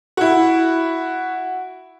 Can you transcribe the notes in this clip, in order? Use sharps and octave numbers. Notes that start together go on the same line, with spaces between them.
E4 F#4